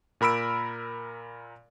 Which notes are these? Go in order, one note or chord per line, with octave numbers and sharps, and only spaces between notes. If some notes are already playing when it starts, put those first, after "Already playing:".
A#2 A#4 B5 E6 D7